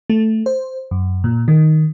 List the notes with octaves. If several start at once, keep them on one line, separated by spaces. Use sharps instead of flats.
A3
C5
F#2
A#2
D#3